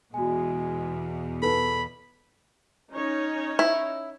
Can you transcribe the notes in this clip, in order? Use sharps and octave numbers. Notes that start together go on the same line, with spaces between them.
E2 B2 G#3 F#4 G#5
A4 B4 B5
C#4 D#4 C#5
E4